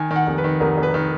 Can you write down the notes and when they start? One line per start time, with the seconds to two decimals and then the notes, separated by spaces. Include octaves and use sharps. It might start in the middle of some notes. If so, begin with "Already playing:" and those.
Already playing: D#3 G#5
0.11 D#3
0.16 F#5
0.27 F1
0.38 B4
0.44 D#3
0.60 F1 A#4
0.77 F1
0.83 B4
0.94 D#3